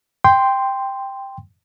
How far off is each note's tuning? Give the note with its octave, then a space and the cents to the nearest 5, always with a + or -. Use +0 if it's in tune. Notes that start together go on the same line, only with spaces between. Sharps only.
G5 +5 C6 -5